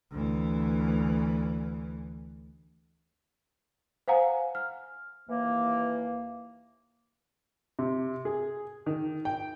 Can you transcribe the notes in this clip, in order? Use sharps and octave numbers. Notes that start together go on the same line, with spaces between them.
D2 E3
C5 F5 F#5 G#5 A#5
F6
D#2 E3 A#3
C3
G#4
D#3
G5